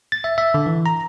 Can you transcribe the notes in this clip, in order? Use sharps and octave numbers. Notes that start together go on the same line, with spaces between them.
A6
E5
E5
D3
E3
A#5